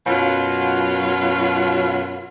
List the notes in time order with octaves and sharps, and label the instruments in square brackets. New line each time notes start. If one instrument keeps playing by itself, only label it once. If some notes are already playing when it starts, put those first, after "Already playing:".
[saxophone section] F#2 B2 F#3 F4